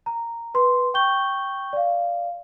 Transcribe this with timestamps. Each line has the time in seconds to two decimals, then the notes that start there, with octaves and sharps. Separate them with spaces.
0.06 A#5
0.54 B4 C6
0.94 G5 C#6 G6 G7
1.73 D5 F5